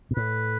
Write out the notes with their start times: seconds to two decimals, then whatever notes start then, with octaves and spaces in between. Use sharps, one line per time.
0.11 B2
0.16 A2 B4